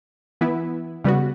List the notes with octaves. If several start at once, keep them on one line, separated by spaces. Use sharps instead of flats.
E3 B3 E4
C#3 G3 B3 F#4